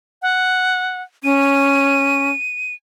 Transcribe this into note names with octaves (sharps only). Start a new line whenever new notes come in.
F#5
C#4 D#7